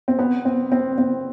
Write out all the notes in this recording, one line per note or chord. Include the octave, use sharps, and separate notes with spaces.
C4
B3
C4
C4
C4